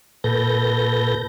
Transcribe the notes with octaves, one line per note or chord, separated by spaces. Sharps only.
A#2 A4 B4 G6 A#6